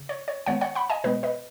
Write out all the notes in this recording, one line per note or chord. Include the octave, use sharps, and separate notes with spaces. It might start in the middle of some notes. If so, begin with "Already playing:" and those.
Already playing: C#3
C#5
C#5
D#3 G#3 B3 C#5 F#5
C#5 F#5
F#5 B5
D#5 G#5
B2 G#3 B3 B4 D#5
B4 D#5